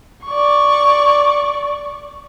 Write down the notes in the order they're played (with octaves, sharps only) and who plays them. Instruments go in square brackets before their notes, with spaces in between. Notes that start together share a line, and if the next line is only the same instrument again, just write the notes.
[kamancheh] D5 C#6